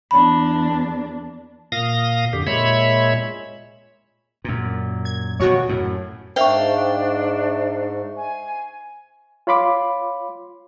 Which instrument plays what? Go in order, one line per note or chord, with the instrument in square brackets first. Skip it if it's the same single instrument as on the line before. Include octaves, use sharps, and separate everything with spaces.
[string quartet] E2 D4 [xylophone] B5
[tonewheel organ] A#2 F5 D#6 A#6
F2 D3 G4
A#2 G#3 C#5 E5 B5
[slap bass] F#2 A#2
[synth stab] G#6
[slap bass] D#2 B2 [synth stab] F#4 C#5
[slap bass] F#2 A2
[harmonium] G#2 [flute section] D4 [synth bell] C5 E5 C#6 [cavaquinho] F5 G5
[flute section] G#5
[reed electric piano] F4 C#5 F5 B5 C6 D6